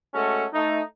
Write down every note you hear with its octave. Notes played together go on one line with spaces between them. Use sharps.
G#3 A3 C#4 F#4 A4
A3 D#4